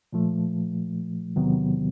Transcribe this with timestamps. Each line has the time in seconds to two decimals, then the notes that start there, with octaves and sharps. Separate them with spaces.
0.13 A#2 F3 A3
1.36 E2 C3 D#3 F#3 B3